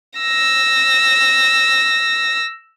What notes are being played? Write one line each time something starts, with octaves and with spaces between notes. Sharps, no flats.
E6 A#6